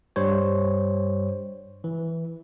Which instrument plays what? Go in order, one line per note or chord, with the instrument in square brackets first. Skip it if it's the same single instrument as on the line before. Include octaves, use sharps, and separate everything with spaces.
[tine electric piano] G2 G3 C5 C#5
E3